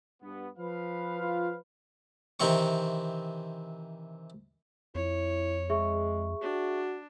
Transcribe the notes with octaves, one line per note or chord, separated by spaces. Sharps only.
G2 B3
F3 B4 F5
F4
C3 D#3 E3 C4 C#6
F2 E4 C#5
G#3 G#4 E5 C#6
D4 F#4